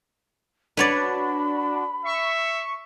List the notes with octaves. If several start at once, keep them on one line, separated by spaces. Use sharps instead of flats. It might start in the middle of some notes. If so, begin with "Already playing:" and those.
D4 F#4 B4 C#5 D5 B5
E5 C#6